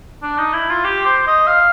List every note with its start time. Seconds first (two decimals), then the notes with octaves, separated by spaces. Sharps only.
0.22 D4
0.38 D#4
0.53 E4
0.70 F4
0.84 G4
1.06 C5
1.27 D#5
1.47 F5